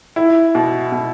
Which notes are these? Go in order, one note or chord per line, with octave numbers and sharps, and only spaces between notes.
E4
B2
B2